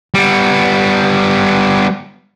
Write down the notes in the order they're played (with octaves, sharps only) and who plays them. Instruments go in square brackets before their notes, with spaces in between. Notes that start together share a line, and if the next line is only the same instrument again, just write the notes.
[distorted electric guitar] G3 B3